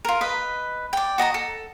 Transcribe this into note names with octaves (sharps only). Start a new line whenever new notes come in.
F4 A#4
B4 D#5 B5
D5 G5
F#4 D#5 A5 A#5
A4